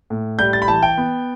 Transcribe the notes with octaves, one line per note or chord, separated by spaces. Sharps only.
A2
G3 G6
A6
B5
E3 A5
G5
B3